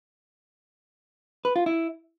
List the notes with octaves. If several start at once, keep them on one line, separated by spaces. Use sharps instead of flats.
B4
F4
E4